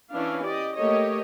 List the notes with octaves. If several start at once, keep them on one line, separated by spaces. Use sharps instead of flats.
E3 C#4 D4 E4 F5
G4 D5 D#5
A3 A#3 G4 C#5 D#5